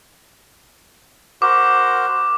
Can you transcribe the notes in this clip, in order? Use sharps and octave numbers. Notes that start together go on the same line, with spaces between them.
F#4 A#4 C5 D6